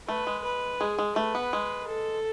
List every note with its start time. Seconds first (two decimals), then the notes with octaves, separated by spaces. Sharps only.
0.08 A3 B4
0.27 G#3
0.45 B4
0.80 G#3 G#4
0.99 G#3
1.16 A3 B4
1.35 B3
1.53 G#3
1.89 A4